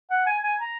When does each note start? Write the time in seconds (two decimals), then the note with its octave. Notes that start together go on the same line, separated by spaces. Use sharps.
0.10 F#5
0.26 G#5
0.43 G#5
0.60 A#5